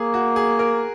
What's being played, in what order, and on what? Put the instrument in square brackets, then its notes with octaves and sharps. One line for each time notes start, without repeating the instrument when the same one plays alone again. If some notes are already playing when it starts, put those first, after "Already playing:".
Already playing: [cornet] A#3 [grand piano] G#4
[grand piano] F#4
G#4
A#4